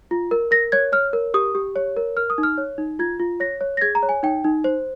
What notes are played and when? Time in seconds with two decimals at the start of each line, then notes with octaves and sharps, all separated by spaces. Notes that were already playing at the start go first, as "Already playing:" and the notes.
0.11 F4
0.31 A#4
0.51 A#4 A#6
0.72 C#5 G#6
0.92 C#5 F6
1.13 A#4
1.34 G4 D#6
1.55 G4
1.76 C#5
1.97 A#4
2.17 A#4 F6
2.30 D#6
2.38 D#4
2.43 F6
2.58 C#5
2.78 D#4
2.99 F4 G#6
3.20 F4
3.40 C#5 A#6
3.61 C#5
3.77 A#6
3.81 G#4 G#6
3.95 A#5
4.03 C#5
4.09 G#5
4.23 D#4 G5
4.44 D#4
4.64 C5